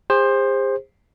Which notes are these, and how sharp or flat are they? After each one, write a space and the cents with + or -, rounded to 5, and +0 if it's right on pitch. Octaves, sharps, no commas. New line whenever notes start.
G#4 -45 C5 +15